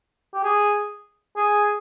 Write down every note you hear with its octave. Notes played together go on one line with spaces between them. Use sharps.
G4
G#4
G#4